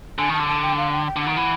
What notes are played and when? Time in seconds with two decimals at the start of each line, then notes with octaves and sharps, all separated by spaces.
0.18 D3 G#5
0.29 D#3 A5
0.40 D3
0.48 A5
0.62 G5
0.77 F5
0.92 G5
1.06 G5
1.16 D3 F#5
1.26 D#3
1.37 E3